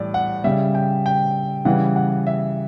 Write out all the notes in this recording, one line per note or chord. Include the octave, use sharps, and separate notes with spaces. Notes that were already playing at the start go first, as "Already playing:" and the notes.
Already playing: A2 E3 G3 D5
F#5
C#3 G3 E5
G5
G5
C#3 E3 G3 F#5
F#5
E5